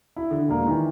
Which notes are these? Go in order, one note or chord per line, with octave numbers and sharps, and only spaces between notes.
E4
D3
E1 A#3
D#3 E3